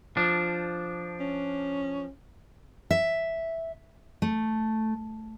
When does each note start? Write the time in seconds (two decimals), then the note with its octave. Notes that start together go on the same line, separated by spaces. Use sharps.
0.17 F3 D4
1.20 C#4
2.91 E5
4.22 A3